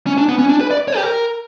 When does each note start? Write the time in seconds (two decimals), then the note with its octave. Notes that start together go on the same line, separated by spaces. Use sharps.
0.07 C#4
0.18 D4
0.29 B3
0.39 C#4
0.49 D4
0.61 B4
0.71 D5
0.88 C#5
0.96 G4
1.04 A#4